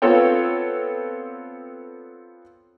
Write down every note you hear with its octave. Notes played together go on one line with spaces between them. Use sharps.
B3 C4 F4 A4 C#5 G5